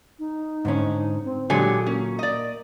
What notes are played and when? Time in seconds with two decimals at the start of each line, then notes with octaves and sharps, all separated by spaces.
0.19 D#4
0.65 G#2 D3 C#4
1.25 C4
1.50 A#2 D3 F#3 G#3 G4 G#5
1.87 A#3 C#4
2.19 D5 D#5